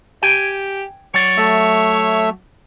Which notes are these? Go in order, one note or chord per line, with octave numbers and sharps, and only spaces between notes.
G4 G5 G#5
F#3 C#5 D5
A3 E5